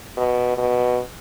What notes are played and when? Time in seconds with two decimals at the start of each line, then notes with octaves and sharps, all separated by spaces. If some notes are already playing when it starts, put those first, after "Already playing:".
0.17 B2
0.58 B2